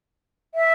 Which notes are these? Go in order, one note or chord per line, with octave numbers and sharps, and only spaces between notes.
E5